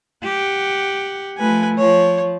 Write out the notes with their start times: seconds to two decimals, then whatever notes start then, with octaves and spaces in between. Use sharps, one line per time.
0.24 G4 F#5
1.37 F3 A3 B4 G#5
1.78 F3 C#5